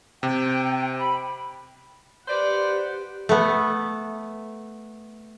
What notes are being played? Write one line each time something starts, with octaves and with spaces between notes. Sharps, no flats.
C3 G5
B5
G4 B4 C5 D5 F#5
A3 B3